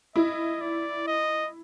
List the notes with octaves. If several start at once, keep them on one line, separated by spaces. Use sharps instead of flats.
E4 D#5
D5
D#5